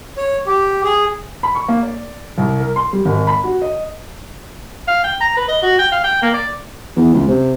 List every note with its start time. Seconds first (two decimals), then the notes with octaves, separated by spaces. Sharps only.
0.17 C#5
0.46 G4
0.84 G#4
1.43 B5
1.55 C#6
1.69 A#3
1.83 D5
2.38 C2
2.60 A#4
2.76 C6
2.93 G3
3.05 G#1
3.27 B5
3.44 F#4
3.62 D#5
4.88 F5
5.04 G5
5.21 A#5
5.37 B4
5.49 D#5
5.63 F#4
5.79 G5
5.92 F5
6.04 G5
6.22 A#3
6.34 D5
6.97 E2
7.14 C#2
7.28 C3